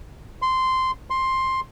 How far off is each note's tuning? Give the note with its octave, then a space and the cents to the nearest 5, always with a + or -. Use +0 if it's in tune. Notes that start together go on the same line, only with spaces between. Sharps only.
C6 -10
C6 +10